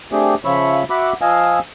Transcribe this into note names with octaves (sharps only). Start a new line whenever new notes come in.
A3 C4 D4 G4 G#4
C#3 F3 C#5 E5 B5 C#6
F#4 E5 F#5 B5 D6
F3 D#5 F5 G#5 E6